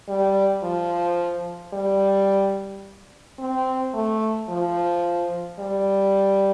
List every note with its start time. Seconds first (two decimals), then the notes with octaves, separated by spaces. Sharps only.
0.08 G3
0.63 F3
1.73 G3
3.39 C4
3.94 A3
4.49 F3
5.59 G3